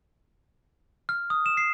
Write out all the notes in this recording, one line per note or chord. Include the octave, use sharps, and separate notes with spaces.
F6
D#6
E7
C7